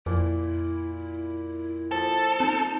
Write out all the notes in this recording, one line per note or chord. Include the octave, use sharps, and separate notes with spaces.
F2 A#2 E4
F3 A4
C4 D#4